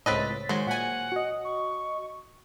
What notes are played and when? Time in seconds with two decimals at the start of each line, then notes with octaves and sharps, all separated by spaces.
0.06 C#2 A2 C4 B4 C#5 D#5 A6 B6
0.49 D#3 F#3 G#3 C5
0.66 A#2 F#5 G#5
1.12 F#4 D#5
1.45 C#6